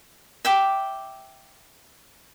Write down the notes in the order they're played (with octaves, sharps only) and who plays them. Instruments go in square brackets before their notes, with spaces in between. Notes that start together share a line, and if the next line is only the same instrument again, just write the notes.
[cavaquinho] E5 G5 D6